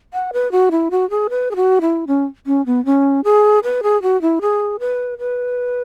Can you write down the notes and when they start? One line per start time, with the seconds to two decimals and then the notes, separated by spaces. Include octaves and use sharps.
0.13 F#5
0.33 B4
0.52 F#4
0.71 E4
0.91 F#4
1.10 G#4
1.30 B4
1.51 G#4
1.56 F#4
1.81 E4
2.07 C#4
2.47 C#4
2.66 B3
2.85 C#4
3.24 G#4
3.63 B4
3.83 G#4
4.02 F#4
4.22 E4
4.41 G#4
4.80 B4
5.19 B4